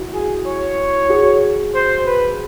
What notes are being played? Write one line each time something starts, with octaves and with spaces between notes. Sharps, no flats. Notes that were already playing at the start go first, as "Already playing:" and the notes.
Already playing: E4 F#4
G#4
C#5
F#4 G#4
C5
B4